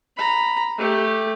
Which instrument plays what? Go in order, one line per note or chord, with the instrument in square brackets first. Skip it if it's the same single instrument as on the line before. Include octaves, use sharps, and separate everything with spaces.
[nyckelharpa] A#5 B5
A3 G4